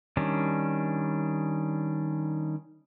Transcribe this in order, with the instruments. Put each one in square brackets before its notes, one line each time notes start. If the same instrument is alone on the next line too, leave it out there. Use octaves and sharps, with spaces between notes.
[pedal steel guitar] D#3 G3 C#4 D4